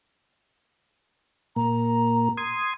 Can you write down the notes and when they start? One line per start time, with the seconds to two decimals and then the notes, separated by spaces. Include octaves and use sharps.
1.56 A#2 A#3 A#5
2.37 C6 D#6 G#6